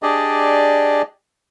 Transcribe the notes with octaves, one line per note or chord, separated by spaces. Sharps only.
D4 G4 G#4 D5 D#5